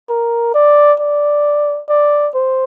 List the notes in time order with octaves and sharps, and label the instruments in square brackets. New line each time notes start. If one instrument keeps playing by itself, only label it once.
[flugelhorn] A#4
D5
D5
D5
C5